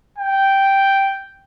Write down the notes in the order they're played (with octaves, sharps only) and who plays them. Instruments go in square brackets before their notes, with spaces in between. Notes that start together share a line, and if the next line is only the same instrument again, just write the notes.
[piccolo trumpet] G5